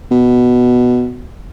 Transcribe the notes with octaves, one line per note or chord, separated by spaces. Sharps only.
B2